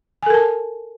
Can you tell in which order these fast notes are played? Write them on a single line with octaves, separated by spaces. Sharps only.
G#5 A4 A#4 A5